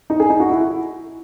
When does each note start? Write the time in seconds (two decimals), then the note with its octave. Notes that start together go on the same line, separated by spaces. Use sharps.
0.10 D#4
0.20 G#4
0.30 D#4
0.40 F#4
0.50 E4